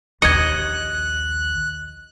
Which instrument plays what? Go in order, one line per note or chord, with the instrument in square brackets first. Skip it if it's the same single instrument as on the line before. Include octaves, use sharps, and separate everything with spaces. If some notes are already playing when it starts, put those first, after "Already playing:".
[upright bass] A#1 D#2 [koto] D#5 [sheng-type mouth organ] F#6 [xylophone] G#6 C#7